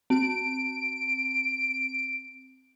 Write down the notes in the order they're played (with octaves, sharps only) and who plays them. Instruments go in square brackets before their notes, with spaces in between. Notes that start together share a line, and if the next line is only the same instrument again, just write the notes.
[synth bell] C4 [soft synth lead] D7